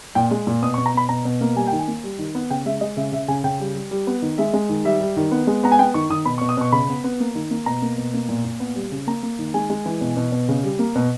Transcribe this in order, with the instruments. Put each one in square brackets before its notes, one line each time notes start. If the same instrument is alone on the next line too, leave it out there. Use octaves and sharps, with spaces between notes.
[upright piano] A#2 G5
G#3
A#2
B2 D#6
C#6
B2
A#5
B2 B5
B2 A#5
B2
A#3
G3 G#5
G5
D#3
G#5
A#3
G3
D#3
B3
C#3 G5
G#3 E5
G#3 D#5
C#3 E5
C#3 E5
C#3 G#5
C#3 G5
G3
G3
G3
B3
D#3
G#3 E5
G#3
D#3
G3 E5
G3
D#3
B3
G#3
B3 A#5
G#5
B3 G5
D#3 C#6
D#3 D#6
B2 B5
C#6
B2
D#6
B2 C#6
C#3 B5
B3
B3
A#3
D#3
A#3
B2 A#5
A#3
B2
A#3
A#2
A#2
B3
G3
C#3
A#3 A#5
A#3
D#3
G#3 G#5
G#3
E3
B2
B2
B2
C#3
G3
A#3
B2